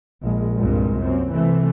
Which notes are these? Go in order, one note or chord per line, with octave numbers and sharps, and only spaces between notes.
A#1 G#3
C2 G2 A#2 G#3
F#2 C4
C3 E3 A3